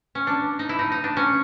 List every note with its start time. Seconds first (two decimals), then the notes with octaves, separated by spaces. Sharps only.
0.15 C#4
0.27 D4
0.59 D#4
0.69 E4
0.79 D#4
0.92 D#4
1.04 D4
1.17 C#4